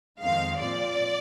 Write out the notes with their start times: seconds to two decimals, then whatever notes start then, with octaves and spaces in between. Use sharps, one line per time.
0.20 F2 D#3 G#3 C4 F5
0.59 A#2 F3 C4 D5